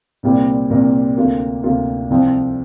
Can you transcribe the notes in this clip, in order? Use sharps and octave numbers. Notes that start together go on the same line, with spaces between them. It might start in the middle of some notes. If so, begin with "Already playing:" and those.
C2 A#2 G3 C4 A#4
C2 A#2 G3 C4 A#4
D2 C3 A#3 F4 A#4
D2 C3 A#3 F4 A#4
C2 C3 F3 C4